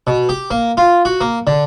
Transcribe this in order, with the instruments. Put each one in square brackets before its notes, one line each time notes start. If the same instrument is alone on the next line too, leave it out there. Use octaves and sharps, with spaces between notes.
[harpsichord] B2
G4
A#3
F4
F#4
A#3
D3